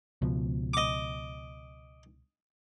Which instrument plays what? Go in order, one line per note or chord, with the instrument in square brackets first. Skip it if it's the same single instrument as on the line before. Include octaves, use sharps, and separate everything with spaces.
[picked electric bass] C#2 B2 F3
[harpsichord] D#5 D6